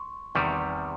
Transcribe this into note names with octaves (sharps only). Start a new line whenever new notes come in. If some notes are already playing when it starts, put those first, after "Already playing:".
Already playing: C6 C#6
E2 C3 D#3 G3 C#6